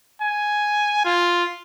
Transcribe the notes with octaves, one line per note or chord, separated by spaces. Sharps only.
G#5
F4